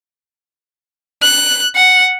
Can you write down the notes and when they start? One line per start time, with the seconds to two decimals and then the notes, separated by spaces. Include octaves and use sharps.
1.22 F#6
1.76 F#5